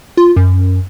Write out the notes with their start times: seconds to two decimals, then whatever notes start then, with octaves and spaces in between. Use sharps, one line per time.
0.17 F4
0.36 F#2